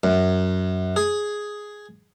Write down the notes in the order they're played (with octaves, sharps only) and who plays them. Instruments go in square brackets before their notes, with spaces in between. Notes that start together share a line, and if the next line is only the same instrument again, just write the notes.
[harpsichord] F#2
G#4